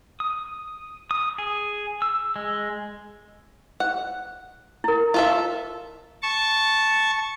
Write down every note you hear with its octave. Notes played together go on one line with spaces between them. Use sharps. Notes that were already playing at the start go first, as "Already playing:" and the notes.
D#6
D#6
G#4
E6
G#3
F#5
E4 A#4
F4 A4 E5
A5 C#6